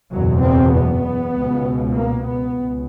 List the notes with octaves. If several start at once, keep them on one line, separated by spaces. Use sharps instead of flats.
F#1 E2 B2 F#3
C4
B3
C#2 B2
A#3
B3
C#2